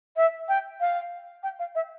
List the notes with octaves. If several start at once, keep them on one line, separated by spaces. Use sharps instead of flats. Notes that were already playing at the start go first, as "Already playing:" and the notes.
E5
G5
F5
G5
F5
E5